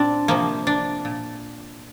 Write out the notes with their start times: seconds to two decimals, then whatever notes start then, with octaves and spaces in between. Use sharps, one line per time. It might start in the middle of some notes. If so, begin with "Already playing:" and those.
Already playing: A#2 C4 D4
0.28 C3 F3 A#3
0.67 D4
1.05 A#2